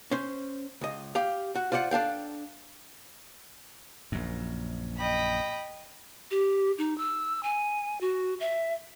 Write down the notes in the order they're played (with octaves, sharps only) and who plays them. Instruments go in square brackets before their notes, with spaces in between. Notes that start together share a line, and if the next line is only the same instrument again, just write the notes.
[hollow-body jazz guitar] C#4 C5
C#2 D#5
G4 F5
F#4
F4 C5 D5 E5 F#5
D4 A4 F5 G5
[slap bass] A#1 F#2
[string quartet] D#5 G5 B5
[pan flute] G4
D#4
E6
G#5
F#4
E5